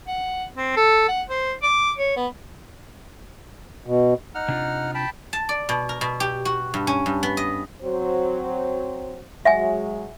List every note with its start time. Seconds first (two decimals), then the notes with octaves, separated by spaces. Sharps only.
0.07 F#5
0.57 C4
0.77 A4
1.09 F#5
1.30 C5
1.63 D6
1.98 C#5
2.17 B3
3.87 B2
4.35 D#4 F#5 F6
4.48 C3 D4 F4
4.94 G5 A5 B5
5.33 A5
5.49 D5
5.69 B2
5.89 A#4
6.01 B2
6.20 G4
6.45 F#4
6.74 G2
6.87 C#4
7.06 G2
7.23 B3
7.37 D#5
7.82 F#3 C4 C5
9.45 F#3 G#3 E5 F#5 G#5